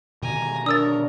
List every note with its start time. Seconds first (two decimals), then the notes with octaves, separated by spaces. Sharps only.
0.22 B2 D3 D#3 G#5 A#5
0.66 D4 A#4 C#5 D#6 E6 A6